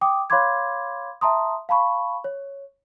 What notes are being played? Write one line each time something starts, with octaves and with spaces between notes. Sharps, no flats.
G5 D6 D#6
C#5 F5 B5 C6 D6 G#6
E5 A5 A#5 C6 D#6
F5 A5 B5 C#6
C#5